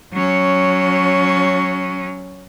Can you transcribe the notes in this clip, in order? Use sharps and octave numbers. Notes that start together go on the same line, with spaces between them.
F#3 C#4